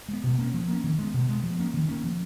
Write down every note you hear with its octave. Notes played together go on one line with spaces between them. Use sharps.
G#3 B3
B2
A#3 C#4
F3
A#3 C#4
D#3
G#3 B3
B2
G#3 B3
F3
A#3 C#4
D#3
A#3 C#4
F3